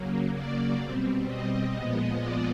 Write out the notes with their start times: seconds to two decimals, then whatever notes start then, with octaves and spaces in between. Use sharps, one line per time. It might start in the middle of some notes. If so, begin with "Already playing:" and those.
Already playing: C#3 F#3 A#3
0.35 D5
0.81 B2 G3 C4
1.28 D#5
1.73 A#2 F3 G#3 B3 D#5
2.19 D5